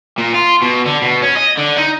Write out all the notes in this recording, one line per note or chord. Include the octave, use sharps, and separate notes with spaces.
A#2
F4
B2
D3
B2
C#4
D#5
D3
D#4